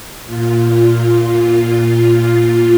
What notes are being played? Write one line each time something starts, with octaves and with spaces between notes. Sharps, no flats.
A#2 F4